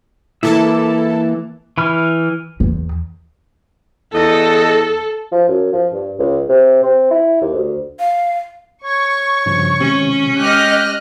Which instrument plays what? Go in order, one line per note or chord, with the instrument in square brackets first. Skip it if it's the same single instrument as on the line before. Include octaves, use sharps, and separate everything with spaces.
[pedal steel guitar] E3 A#3 E5 [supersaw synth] E4 A4 A5
[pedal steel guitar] E3 B5 F6
[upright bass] E2
[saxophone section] E2 D#5 [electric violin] A4
[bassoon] F3
F#2
F3
G2
C#2
C3
C4
E4
D#2
D2
[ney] F5
[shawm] C#5 [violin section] C#6
[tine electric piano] G2 C#3 F3
[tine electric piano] C3 D#3 G#3 [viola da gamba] C#4
[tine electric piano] G#3 [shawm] G4 [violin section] D#5 F6 F#6